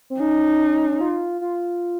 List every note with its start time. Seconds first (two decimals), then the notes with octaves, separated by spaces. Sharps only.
0.10 C4
0.19 C#4 D#4
1.01 F4
1.41 F4